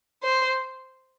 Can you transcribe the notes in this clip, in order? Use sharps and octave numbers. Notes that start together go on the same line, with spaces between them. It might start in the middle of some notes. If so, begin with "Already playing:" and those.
C5